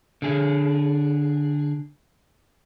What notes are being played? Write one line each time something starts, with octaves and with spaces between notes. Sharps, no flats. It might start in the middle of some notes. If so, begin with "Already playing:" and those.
D3 G#4